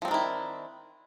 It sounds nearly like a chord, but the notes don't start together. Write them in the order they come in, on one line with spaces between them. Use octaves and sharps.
F3 C4 D4 D#3 E4